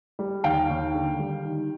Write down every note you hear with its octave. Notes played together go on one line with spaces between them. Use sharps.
G3
D#2 F5 G5
D#2
D3
G3
D#3